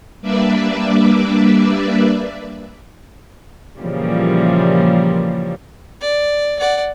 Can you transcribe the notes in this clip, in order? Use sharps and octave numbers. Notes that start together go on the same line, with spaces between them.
G3 A#3 D4 B4 D5 E5
A#2 C#3 E3 F3 G3 A#3
D5
D5 F#5